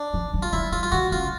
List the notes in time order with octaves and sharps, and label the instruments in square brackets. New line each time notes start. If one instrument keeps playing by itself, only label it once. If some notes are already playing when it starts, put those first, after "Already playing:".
Already playing: [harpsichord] D4
[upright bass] F3
F#3
[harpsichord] F4
[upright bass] F3 [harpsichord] E4
[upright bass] E3 [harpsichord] F4
[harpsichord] F4
[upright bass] D3 [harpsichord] F#4
[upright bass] C#3 [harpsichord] F4